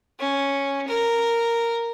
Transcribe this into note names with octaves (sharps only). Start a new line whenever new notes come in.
C#4
A#4